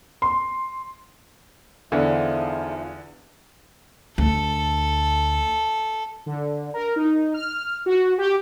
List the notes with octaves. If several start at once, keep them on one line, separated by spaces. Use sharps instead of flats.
C6
E2 G#2 D3 F3 E5
D2 A4
D3
A#4
D#4
F6
F#4
G4